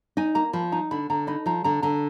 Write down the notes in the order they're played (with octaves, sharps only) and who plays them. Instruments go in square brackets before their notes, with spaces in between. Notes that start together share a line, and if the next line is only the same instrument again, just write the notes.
[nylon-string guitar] D#4 [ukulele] G#5
[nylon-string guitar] A#3 [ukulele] A#5
[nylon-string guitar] F3 [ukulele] B5
[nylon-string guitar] D#4 [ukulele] A#5
[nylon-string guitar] D3 [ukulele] B5
[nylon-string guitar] D3 [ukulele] A#5
[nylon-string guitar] D#4 [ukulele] B5
[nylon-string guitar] F3 [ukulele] A#5
[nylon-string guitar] D3 [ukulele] A#5
[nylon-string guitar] D3 [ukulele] A#5